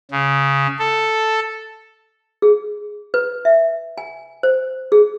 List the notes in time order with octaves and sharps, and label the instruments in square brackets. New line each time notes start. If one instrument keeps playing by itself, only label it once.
[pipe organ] C#3
A4
[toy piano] G#4
B4
E5
G#5
C5
G#4